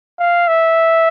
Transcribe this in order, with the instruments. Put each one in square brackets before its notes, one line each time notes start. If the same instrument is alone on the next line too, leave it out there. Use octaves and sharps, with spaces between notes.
[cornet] F5
E5